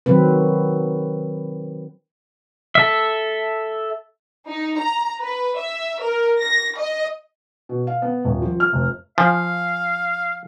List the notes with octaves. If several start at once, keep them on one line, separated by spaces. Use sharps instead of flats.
D#3 F#3 C4 B4
A4 E5
D#4
A#5
B4
E5
A#4
A#6
D#5
B2
F5
B3
D#1
F3
F6
F1
F3 F5 G#5